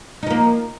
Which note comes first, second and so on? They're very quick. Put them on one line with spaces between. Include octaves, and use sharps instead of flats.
D#4 F3 A#3